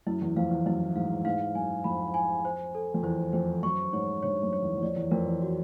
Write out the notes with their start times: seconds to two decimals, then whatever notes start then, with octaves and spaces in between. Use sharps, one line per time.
0.07 F#2 E4
0.22 E2
0.36 F2 F5
0.51 E2
0.66 F#2 E4
0.95 G#2 F5
1.25 G#2 F5
1.55 F#2 G#5
1.84 F2 B5
2.14 G#5
2.45 C5
2.75 A4
2.94 F2
3.03 E2 C5
3.33 F2 C5
3.63 F#2 C#6
3.93 G#2 C#5
4.23 G2 C#5
4.43 F#2
4.53 C#5
4.63 E2
4.77 E2
4.82 F2 D5
4.96 E2
5.11 F2 A#4
5.26 E2
5.42 F#4